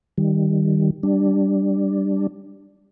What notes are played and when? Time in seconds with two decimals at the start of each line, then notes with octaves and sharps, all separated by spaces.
0.18 D#3 G3
1.03 G3 D4